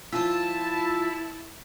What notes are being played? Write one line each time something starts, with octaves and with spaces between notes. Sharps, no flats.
F3 E4 F4 A5 B5 E6